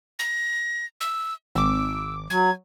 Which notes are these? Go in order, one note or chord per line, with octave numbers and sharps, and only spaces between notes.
A#6
E6
G#1 D6 E6
F#3 G#6